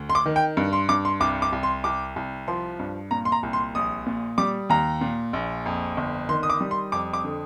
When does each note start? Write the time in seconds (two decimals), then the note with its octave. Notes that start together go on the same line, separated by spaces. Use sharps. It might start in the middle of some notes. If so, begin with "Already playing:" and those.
Already playing: D2
0.10 C6
0.15 D6
0.26 D#3
0.36 G5
0.57 G2
0.73 C6
0.89 G2 D6
1.05 C6
1.20 C2 D6
1.42 D6
1.53 C2
1.63 C6
1.84 C2 D6
2.16 C2
2.48 F3 C6
2.79 G2
3.11 A#2 A#5
3.25 C6
3.32 A#5
3.43 C2
3.53 C6
3.75 A#1 D#6
4.06 A#2
4.38 G3 D6
4.69 D#2 A#5
5.01 A#2
5.33 A#1
5.66 F2
5.97 G1
6.29 D#3 C6
6.43 D#6
6.50 D6
6.61 G3
6.71 C6
6.92 F2 D6
7.13 D6
7.24 D3